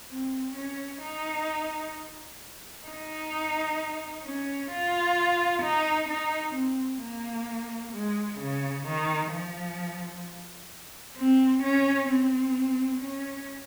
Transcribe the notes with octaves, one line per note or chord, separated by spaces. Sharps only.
C4
C#4
D#4
D#4
C#4
F4
D#4
D#4
C4
A#3
G#3
C#3
D#3
F3
C4
C#4
C4
C#4